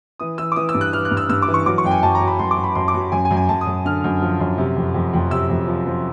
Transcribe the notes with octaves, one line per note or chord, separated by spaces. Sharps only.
E3 D#6
E3 E6
D6
E3 D#6
E6
G2
F#6
E3 F6
F#6
G2
E6
G2 E6
D6
E3
C#6
F#3 D6
C#6
F#2 G5
G#5
F#2 A5
A#5
F#3
B5
F#2 C6
D6
F#3
B5
F#2 C6
D6
F#3
F#2 G#5
G#5
F#2
G#5
F#2 A5
D#6
F#2
D3 F6
F#2
F3
F#2
C3
F2
F2
F2
C3 E6
F2
F3
F3